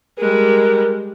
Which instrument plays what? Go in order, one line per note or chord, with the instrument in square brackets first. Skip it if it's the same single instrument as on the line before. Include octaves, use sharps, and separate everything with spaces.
[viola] G3 G#3 [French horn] A#4